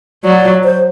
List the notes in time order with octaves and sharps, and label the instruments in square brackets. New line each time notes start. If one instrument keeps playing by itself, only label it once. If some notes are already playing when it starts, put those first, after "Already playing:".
[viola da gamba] F#3 [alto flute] D5
[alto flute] C5